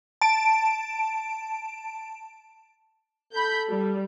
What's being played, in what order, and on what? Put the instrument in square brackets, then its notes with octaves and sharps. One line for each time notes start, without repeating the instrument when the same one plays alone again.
[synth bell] A5 D7
[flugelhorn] A4 [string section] B5 G6
[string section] G3